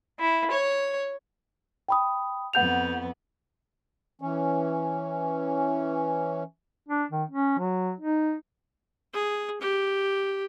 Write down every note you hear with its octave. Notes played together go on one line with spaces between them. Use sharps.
E4
C#5
G5 B5 D#6
F2 B3 F#5 G6 F7
E3 C#4
D4
D#3
C#4
F#3
D#4
G#4
G4